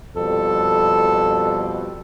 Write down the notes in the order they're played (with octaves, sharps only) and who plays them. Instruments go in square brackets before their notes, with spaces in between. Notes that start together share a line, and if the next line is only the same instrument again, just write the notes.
[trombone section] F2 B2 G3 [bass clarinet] A4